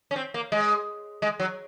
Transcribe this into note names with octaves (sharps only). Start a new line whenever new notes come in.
C#4
C4
A#3
G#3
G#3
F#3